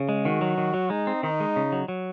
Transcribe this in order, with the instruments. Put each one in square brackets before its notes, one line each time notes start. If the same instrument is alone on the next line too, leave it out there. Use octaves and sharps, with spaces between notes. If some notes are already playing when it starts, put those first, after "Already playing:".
Already playing: [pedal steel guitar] C#3
G#3
[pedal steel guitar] D#3 [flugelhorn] F#4
[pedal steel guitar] F#3
D#3
F#3
[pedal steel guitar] G#3 [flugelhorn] D#4
[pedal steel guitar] C4
[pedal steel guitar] D#3 [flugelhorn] D#4
[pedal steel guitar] G#3
C#3
F#3
F#3